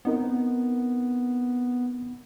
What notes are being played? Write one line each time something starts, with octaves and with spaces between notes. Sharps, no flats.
B3 C4 D#4 A#4